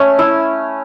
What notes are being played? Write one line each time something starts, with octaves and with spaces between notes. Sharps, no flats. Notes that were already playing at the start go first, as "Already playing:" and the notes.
Already playing: A3 C#4
E4